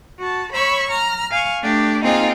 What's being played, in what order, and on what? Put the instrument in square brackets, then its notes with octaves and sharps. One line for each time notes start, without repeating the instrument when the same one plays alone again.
[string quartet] F#4 A5
C#5 B5 C#6 E6
A#5 F6
F5 G#5 C#6
A3 D4 G4
A#3 C4 D#4 F4 G#4